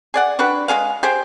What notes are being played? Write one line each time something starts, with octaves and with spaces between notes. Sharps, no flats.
G#4 D5 F#5
D4 F#4 G4 B4
G#3 B3 G#4 F5
G4 G#4 C5 G5